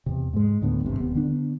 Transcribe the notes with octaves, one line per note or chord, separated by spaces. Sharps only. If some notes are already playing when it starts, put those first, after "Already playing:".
E2 C3
G#2 G#3
D2 A2 D3 B3
G#1 G2 C3
D#1 B3
D3 B3 D4